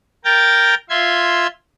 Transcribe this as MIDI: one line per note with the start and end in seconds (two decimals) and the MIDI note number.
0.25 0.75 70
0.25 0.75 79
0.25 0.75 82
0.25 0.75 91
0.25 0.75 93
0.90 1.47 65
0.90 1.47 76
0.90 1.47 84
0.90 1.47 92